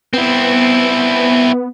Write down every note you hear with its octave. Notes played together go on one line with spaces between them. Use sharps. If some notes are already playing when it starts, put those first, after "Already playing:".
B3 C4 E4